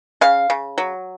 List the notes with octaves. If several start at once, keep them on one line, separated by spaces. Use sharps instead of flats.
C#3 F5
C#3
F#3